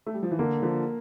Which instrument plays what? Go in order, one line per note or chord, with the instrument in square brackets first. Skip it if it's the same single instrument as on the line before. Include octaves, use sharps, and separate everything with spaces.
[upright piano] A3
G3
F3
E3
[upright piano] D3 [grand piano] A#3
[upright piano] D3 F3